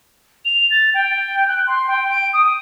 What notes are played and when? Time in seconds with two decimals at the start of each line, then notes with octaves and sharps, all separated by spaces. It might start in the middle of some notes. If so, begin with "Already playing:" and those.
0.45 F7
0.71 A6
0.94 G5
1.48 F#6
1.67 C6
1.88 G5
2.10 D7
2.33 D#6